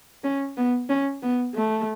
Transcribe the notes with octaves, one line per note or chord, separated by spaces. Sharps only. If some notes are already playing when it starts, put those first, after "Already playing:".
C#4
B3
C#4
B3
A3